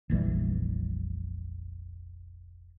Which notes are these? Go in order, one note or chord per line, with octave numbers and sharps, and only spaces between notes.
F1 A#1 E3 G3